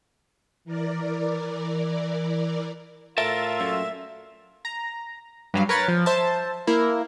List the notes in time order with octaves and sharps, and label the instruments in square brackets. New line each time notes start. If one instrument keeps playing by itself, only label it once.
[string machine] E3 A#4 D5
[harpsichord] A2 [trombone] F4 [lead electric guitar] A#4 A5 [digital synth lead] E5
[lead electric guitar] F#2 [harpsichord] A#2 A3
[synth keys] A#5
G2 F#3 F5
A#4 B4 C#5 B5 A6
F3
C5 E5 A5
A#3 E4 A#4